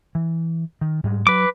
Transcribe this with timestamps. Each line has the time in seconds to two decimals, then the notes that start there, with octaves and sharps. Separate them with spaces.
0.15 E3
0.81 D#3
1.04 G#2 G3 G#3
1.27 F#3 B4 D6